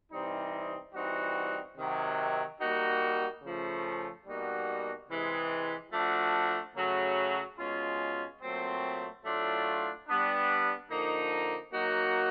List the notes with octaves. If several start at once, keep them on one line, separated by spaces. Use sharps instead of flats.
C3 E3 G3 C4 D#4
E3 G3 C4 D#4 F#4
C3 D#3 F#3
G3 A#3 D#4 F#4
C#3 F3 A3
B2 G3 A#3 D#4 F#4
C3 E3 G#3
F3 A3 D4 F#4
C#3 F#3 A3
B2 G#3 C#4 F4
A#2 F#3 A3 C4
A2 F#3 A3 D4 F4
G3 B3 D4
D3 F3 A#3 D#4
F#3 A#3 D#4 F#4